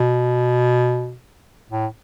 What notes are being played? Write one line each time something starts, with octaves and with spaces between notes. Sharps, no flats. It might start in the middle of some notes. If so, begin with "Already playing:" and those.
Already playing: B2
A2